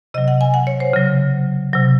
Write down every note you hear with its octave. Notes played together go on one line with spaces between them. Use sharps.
C3 F#3 D#5
F#5
G#5
F#5
C#5
C5
C#3 F#3
C3 F#3